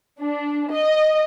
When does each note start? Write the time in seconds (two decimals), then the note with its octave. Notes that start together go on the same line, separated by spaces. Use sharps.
0.21 D4
0.72 D#5